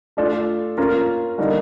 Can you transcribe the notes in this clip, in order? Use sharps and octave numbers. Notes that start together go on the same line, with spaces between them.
A3 D4 F4 A4
A#3 C#4 F4 A#4
D3 G3 A#3 D#4